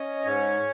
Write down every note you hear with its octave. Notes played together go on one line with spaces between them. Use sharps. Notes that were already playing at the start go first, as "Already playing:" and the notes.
Already playing: C#4 D#5
G#2 C#5